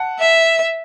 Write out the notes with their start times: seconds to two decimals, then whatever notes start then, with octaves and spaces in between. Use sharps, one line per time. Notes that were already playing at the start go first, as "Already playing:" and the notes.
Already playing: F#5 A5
0.20 E5